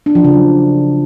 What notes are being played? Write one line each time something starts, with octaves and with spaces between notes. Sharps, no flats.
D4
F3
C#3
F#3